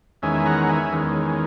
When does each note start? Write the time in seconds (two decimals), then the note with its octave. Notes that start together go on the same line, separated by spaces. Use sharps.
0.22 E2 D#3 G#3 C#4 E5 G#5
0.46 F#5 A#5
0.69 E5 G#5
0.92 E2 D#3 G#3 C#4